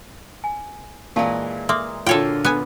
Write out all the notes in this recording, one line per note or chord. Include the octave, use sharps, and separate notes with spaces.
G#5
A#2 E3 G#3 G4 F5 A5
A#3 E5 C6 D#6
A#2 D3 F4 F#4 A4 C#5 G5
B3 G#5